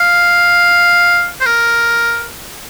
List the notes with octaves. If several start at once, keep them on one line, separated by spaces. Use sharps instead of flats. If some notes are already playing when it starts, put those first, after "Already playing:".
Already playing: F5
C5
A#4